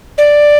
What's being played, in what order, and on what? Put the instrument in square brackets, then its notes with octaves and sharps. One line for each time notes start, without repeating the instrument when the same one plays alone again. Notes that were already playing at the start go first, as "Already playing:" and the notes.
[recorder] D5